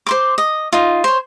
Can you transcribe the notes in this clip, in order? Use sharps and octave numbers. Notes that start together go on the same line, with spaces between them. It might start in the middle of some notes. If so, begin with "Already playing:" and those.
C5 C6 D6
D#5
D#4 F4
C5 C#5